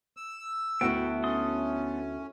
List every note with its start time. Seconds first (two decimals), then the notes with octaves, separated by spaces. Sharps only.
0.17 E6
0.81 D2 B3 E4 F#4 G5
1.24 C#4 A4 C6 D#6